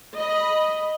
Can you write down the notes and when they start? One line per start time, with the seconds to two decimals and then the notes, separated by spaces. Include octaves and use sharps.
0.16 D#5 B5